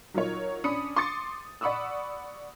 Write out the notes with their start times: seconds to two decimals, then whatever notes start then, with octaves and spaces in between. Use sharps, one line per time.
0.14 F#3 D#4 F4 A#4 C#5
0.64 C#4 D4 B5 D#6 C#7
0.96 C6 D6 D#6 A6 C#7
1.61 D5 F#5 B5 C#6 D#6 E6